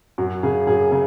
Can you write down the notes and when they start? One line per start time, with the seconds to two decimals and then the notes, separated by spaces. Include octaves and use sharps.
0.18 F#2 F#4
0.43 C#3 G#4
0.67 F#2 G#4
0.92 C#3